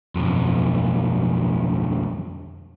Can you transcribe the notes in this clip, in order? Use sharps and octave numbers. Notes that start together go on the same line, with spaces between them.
B1 F2